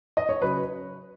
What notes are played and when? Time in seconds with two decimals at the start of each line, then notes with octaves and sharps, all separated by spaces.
0.17 D#5
0.29 C#5
0.41 C#3 F#3 B4